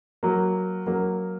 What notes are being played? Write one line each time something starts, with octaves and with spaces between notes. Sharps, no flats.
F#3 A#3
F#3 A#3